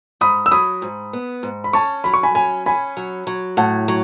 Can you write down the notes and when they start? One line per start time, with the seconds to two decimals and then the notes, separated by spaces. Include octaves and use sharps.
0.21 G#2 B5 D#6
0.46 E6
0.51 F#3 B5 D#6
0.82 G#2
1.13 B3
1.43 G#2
1.64 B5
1.73 C#4 A5 C#6
2.04 F#3 B5
2.14 C#6
2.23 G#5 B5
2.35 C#4 G#5 B5
2.66 C#4 G#5 B5
2.97 F#3
3.27 F#3
3.57 A2 F#5 A5
3.88 F#3